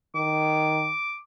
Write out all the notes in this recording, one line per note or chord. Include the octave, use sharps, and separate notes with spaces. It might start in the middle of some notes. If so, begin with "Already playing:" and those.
D#3 D6